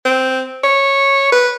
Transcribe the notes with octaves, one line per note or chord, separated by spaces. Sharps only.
C4
C#5
B4